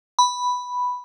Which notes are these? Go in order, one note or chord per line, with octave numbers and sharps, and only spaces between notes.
B5